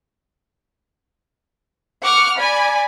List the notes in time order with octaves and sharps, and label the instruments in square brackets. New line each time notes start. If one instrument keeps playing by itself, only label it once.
[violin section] F#5 C#6 D6 F6
D5 G#5 B5